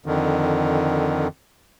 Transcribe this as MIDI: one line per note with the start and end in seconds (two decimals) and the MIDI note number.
0.06 1.27 41
0.06 1.27 50
0.06 1.27 51